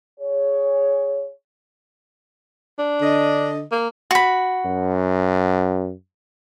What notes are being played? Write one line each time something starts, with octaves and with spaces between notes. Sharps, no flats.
G#4 C#5
D4
D3 D#5
A#3
F#4 B5
F#2